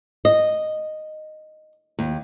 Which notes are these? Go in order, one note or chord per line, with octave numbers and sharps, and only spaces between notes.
D#5
D#2